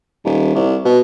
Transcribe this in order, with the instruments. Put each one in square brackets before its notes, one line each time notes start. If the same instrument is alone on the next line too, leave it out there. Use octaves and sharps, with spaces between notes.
[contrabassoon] D#1
C2
B2